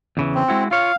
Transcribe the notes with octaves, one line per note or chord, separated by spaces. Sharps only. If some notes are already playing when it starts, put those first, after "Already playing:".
E2 C#3 E3
C4
G#3 E4 F#4
F4 C#5 F5